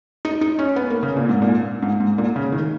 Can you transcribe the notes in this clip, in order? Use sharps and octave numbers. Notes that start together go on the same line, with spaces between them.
D#4
D#4
C#4
B3
A#3
C#3
A#2
G#2
A#2
G#2
G#2
A#2
C#3
D#3